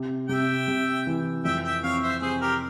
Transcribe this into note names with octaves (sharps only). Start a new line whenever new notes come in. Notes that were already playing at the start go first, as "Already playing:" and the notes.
Already playing: C3
C3 E5 G5
C3
E3
F2 E5 G5
E5 G5
C4 C#5 F5
C5 E5
C3 G#4 C5
G4 A#4